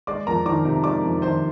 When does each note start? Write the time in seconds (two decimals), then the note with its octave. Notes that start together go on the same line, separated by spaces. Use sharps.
0.07 G#3 D5 D6
0.27 F2 A#4 A#5
0.46 D#3 D5 D6
0.65 C3
0.84 G#3 D5 D6
1.03 F2
1.22 D#3 C5 C6